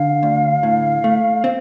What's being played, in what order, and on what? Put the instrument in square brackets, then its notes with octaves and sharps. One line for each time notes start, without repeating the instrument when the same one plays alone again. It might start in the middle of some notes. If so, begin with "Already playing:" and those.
Already playing: [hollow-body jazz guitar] D3 [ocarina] F5
[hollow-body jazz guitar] D2
A2
A3
[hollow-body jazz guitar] C4 [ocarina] F5